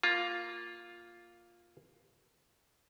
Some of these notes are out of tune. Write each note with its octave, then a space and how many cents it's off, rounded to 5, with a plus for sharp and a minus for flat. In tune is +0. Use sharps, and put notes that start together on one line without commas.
A#3 +0 F4 +5